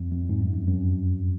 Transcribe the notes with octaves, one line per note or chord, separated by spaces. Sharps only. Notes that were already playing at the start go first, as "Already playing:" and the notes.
Already playing: F2
F2
G#2
F#2
F2
F#2